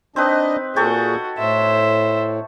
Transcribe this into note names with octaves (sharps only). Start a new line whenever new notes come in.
C4 D4 D#4 B4 D#5
A#2 F#4 G#4 A4 C#5 G5
A2 C5 E5